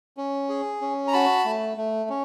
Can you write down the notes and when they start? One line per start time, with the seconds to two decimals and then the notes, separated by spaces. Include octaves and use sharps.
0.17 C#4
0.49 G#4
0.81 C#4
1.08 A#5
1.13 F#4 A5 B5
1.45 A3
1.77 A3
2.10 C#4